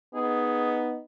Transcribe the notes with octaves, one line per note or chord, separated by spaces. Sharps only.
B3 D#4 G#4